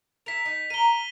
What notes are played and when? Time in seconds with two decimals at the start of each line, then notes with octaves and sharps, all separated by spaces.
0.26 E4 A#4 B6 F7
0.45 D#4
0.70 A#4 A#5 D#7 G7